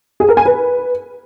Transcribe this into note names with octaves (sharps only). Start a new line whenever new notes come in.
G#4
A#4
G#5
B4